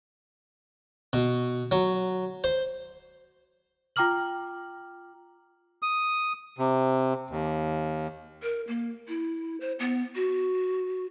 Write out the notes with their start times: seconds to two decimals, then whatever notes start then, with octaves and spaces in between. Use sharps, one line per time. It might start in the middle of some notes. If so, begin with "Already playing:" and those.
1.13 B2
1.71 F#3
2.44 C5
3.96 F4 G5 A#5 D6 F6 F#7
5.82 D#6
6.58 C3
7.30 D#2
8.43 A#4
8.68 A#3
9.08 E4
9.61 C5
9.80 B3
10.16 F#4